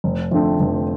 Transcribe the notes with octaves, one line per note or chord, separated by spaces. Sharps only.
F1
F2 D3 A3 C4
F1